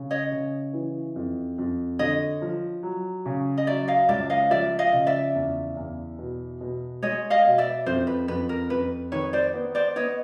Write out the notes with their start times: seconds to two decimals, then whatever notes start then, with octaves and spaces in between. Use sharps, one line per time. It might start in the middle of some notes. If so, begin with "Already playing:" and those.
Already playing: C#3
0.11 C#5 D#5
0.31 C#3
0.73 E3
1.16 F2
1.58 F2
1.99 D3 C#5 D#5
2.42 F3
2.83 F#3
3.26 C#3
3.57 D#5
3.67 F#3 D5 E5
3.88 D#5 F5
4.08 C#2 D5 E5
4.30 D#5 F5
4.51 F3 D5 E5
4.79 D#5 F5
4.93 C#3
5.07 D5 E5
5.35 E2
5.77 E2
6.19 B2
6.61 B2
7.02 G#3 C#5 D#5
7.30 D#5 F5
7.44 B2
7.58 D5 E5
7.86 F2 C5
8.07 B4
8.28 F2 B4
8.49 A#4
8.70 F2 B4
9.12 D#3 B4 C#5
9.33 C5 D5
9.54 B3
9.75 C5 D5
9.96 B3 C#5 D#5